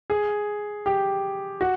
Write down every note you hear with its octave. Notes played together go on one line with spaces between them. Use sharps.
G#4
G4
F#4